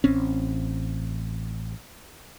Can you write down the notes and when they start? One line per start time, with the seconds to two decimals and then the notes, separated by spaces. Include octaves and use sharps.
0.04 A1 C4 C#4